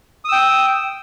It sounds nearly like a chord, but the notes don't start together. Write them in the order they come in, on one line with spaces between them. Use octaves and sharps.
D#6 E6 G5